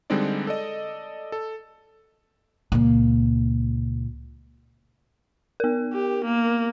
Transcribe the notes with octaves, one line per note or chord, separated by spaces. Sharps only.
D3 G3 G#3 C4 D#4 D5
A4 D5 D#5
A4
C#2 A#2
B3 A#4
G4
A#3